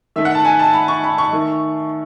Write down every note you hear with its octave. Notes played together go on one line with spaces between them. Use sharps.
D#3 A3 E5
F#5
A5
G#5
A5
B5
C#6
B5
C#6
D#3 A3